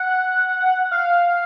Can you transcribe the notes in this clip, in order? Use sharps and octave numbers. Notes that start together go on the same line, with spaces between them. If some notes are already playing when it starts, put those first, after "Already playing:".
Already playing: F#5
F5